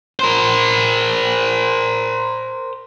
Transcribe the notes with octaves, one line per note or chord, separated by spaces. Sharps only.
A#4 C5